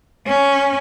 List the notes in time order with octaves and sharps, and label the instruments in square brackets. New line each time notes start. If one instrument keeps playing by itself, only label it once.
[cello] C#4